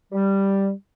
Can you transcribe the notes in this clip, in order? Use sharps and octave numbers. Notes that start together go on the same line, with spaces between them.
G3